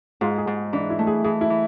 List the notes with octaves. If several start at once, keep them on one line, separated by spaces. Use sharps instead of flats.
G#2 F4
G#4
G#2
E3 D4
E4
A3
G#4
E3 G#4
E4
E3